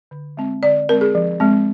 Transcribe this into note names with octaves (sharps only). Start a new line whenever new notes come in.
D3
G#3 C4
D3 D5
G#3 C4 A#4
G#4
F3
G#3 C4